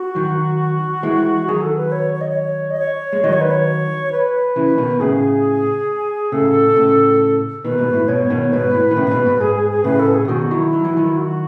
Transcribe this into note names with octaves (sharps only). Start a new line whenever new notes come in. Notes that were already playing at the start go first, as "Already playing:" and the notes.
Already playing: F#4
D#3 F#3
E3 G#3
D#3 F#3 G#4
A4
B4
C#5
C#5
D#5
C#5
D#5
C#5
G#3
D#3 F#3 D#5
C#5
B4
C#5
B4
C#3 E3
B2 D#3
A2 C#3 G#4
A2 C#3 A4
A2 C#3
B2 D#3 B4
G#2 B2
A2
G#2 B2 C#5
B2 D#3
G#2 B2 B4
A2
D#3
A2 C#3
C#3
G#2 B2
G#2
G#2 G#4
G#4
G#4
A2 C#3 B4
A4
G#4
C#3
B2 D#3 F#4
D#3 F#3 E4
F#3
E3
D#3 F#3
F#4